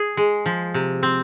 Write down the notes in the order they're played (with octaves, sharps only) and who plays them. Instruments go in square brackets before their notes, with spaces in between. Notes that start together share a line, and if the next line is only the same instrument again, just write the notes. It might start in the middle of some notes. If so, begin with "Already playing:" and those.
Already playing: [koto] G#4
G#3
F3
C3
C4